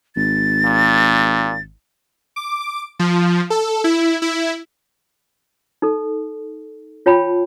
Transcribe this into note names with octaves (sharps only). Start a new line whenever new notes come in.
G#1 A6
A#2
D6
F3
A4
E4
E4
D#4 A4
F4 C#5 G5 A5 B5